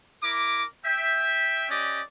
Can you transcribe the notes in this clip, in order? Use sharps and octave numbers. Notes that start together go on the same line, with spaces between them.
E4 A#4 D6
E5 G5
C#4 G4 D5 D#5